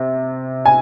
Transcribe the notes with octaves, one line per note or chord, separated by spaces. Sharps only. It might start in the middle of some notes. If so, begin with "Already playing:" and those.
Already playing: C3
G#5